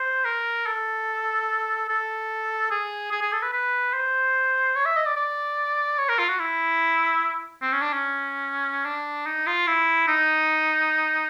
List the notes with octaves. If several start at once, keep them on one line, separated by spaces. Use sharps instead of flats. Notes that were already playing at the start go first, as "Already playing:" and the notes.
Already playing: C5
A#4
A4
A4
G#4
G#4
G#4
A4
B4
B4
C5
C#5
E5
D#5
D5
D5
C#5
A#4
F4
F#4
E4
C4
C#4
D4
C#4
D4
D#4
F4
E4
D#4